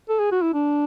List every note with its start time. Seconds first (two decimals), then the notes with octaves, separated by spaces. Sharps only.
0.09 A4
0.19 G#4
0.31 F#4
0.42 E4
0.54 D4